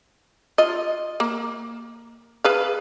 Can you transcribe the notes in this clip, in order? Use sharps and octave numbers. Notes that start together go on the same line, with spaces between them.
F4 D#5
A#3
G#4 B4 F5